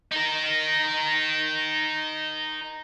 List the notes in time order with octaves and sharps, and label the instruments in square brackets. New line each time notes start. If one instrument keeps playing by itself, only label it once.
[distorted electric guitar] D#4 A#4